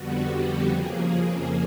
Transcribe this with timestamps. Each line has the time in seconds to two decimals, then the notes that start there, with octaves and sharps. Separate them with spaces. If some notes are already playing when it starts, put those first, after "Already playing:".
Already playing: F2 D3 G3 B3 F#4
0.28 G4
0.66 F2 C#3 F3 A#3 G#4